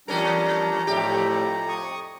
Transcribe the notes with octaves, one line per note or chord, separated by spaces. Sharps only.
E2 G3 C#4 D4 A#4 A#5
F2 A2 G3 A3 G4
C#6 D#6